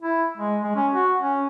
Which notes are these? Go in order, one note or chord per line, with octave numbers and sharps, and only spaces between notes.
E4
G#3
G#3
C#4
F#4
C#4